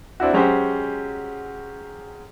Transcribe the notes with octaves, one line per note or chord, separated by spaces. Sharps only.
C4 D4 E4 F#4
F#3 G#3 C#4 F#4 G4 C5